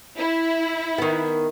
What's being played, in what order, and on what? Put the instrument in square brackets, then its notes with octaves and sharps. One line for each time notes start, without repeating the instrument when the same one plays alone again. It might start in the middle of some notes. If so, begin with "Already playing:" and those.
[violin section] E4
[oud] D#3 B3